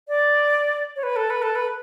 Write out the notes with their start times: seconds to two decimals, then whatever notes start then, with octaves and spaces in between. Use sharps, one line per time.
0.08 D5
0.96 C#5
1.03 B4
1.16 A4
1.30 B4
1.42 A4
1.55 B4